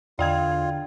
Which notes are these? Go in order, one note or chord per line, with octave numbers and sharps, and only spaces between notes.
E2 D3 F4 D5 D#5 G5 G#6